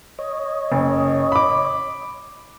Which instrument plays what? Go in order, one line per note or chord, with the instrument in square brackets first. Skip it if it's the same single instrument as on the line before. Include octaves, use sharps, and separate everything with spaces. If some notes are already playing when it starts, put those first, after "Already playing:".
[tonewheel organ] C#5 D#5
[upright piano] F#1
B5 D6